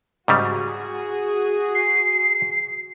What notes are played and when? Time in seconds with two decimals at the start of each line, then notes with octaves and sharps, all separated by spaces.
0.28 G#2 C#3 G3 F#4 G#4
1.75 C7